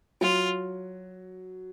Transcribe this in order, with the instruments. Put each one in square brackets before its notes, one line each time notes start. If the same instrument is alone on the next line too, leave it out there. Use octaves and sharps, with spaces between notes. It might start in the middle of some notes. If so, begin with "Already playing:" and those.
[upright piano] F#3 [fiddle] F4